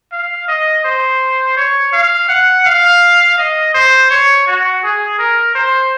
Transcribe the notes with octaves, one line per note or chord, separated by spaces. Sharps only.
F5
D#5
C5
C#5
F5
F#5
F5
D#5
C5
C#5
F#4
G#4
A#4
C5